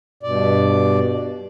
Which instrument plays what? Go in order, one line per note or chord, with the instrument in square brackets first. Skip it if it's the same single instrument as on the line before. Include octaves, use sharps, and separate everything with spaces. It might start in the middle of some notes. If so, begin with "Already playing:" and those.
[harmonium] G2 B2 D5